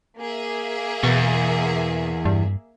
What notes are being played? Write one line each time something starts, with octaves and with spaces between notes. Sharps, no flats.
A#3 G#4 E5
E2 B2
G2